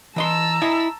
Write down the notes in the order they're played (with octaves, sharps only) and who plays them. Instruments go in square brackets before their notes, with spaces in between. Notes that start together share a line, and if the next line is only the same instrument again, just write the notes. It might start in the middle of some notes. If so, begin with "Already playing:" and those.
[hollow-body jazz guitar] E3 D#5 C6 [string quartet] A5 A#5 E6
[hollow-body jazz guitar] E4 D#5 G#5